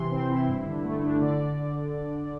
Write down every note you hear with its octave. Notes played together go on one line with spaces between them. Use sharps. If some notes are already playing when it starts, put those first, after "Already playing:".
Already playing: C3 E3 C6
C4
E4
G2
D3
A3
D4
D3 D5